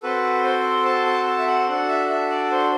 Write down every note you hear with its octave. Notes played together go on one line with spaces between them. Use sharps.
C4 F#4 A4 B4
C5
A5
A5
A5
E5
F#5
D4 F#4 A4 F#5
E5
E5
D5
C5